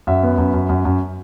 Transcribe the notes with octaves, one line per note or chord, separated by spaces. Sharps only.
F#2 E5
B3
F#2
F#2
F#2
F#2